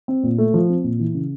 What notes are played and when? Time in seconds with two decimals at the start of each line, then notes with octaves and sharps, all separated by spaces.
0.08 C4
0.23 A#2
0.38 A3
0.54 F3
0.69 C4
0.84 A#2
0.99 E3
1.14 C#3